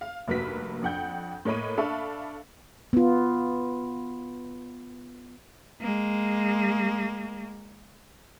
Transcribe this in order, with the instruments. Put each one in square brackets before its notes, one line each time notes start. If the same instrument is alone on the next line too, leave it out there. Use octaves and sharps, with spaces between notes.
[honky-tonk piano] F5
F1 G2 A#3 F#4 B4 B6
F2 D4 F#5 G5 G6
A2 A#3 C#5 D#5 B5 D#7
D4 A4 E5 F5 B5 C#6
[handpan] B3 F4
[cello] G#3 A#3